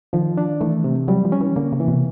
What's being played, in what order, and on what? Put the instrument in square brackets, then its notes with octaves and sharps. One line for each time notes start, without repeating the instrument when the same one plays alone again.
[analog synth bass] D#3 [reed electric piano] F3
[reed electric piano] D4
[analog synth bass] E3 [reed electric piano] A3
[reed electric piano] C3
[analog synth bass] F#3 [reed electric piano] G3
[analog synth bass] F3
[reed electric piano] C#4
[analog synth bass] E3
[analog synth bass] D3 [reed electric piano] A#3
[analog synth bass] C#3
[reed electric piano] E3
[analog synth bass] C3